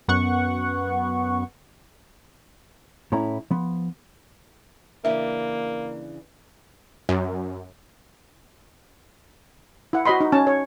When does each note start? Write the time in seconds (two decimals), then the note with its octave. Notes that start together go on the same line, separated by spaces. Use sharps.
0.08 F#2 B3 F#5 C#6
3.12 A2 A3 C#4 E4 C#5 A#5
3.51 F3 B3
5.05 C#3 E3 A#3 D4 E5
7.09 F#2
9.93 E4 F#5
10.05 F#4 C5 D#5 B5 C6
10.21 D#4
10.32 C#4 A5
10.47 C#5